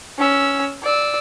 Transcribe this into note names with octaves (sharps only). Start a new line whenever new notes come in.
C#4 E6
D5 E6